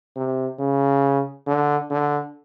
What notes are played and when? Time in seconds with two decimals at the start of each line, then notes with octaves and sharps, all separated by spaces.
0.16 C3
0.59 C#3
1.47 D3
1.90 D3